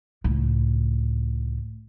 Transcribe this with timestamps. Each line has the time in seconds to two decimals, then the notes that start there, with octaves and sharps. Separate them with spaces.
0.24 C#2 A2